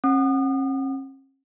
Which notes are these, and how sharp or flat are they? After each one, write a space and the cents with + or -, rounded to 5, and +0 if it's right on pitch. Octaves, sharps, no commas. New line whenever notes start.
C#4 -45 F#5 -5 D#6 -35